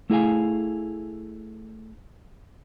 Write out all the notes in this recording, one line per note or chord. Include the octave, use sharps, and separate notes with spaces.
A3 E4 G#4 F5 G#5